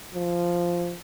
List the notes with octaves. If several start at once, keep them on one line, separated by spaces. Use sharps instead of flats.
F3